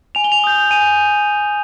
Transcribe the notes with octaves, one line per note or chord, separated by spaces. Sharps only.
G#5 F7
G7
F7
D#6 G6
G#5 D#7